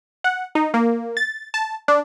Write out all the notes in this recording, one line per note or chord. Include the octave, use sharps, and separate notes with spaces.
F#5
D#4
A#3
A6
A5
D4